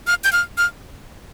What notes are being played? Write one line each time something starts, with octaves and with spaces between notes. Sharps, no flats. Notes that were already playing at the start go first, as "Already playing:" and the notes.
F6
G6
F6
F6